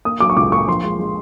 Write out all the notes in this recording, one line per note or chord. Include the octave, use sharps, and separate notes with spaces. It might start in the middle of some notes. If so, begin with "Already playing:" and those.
A#3 D#6
F#3 D6
C#6
C#2 D6
A#3 C#6
F3 C6
G#3
G#3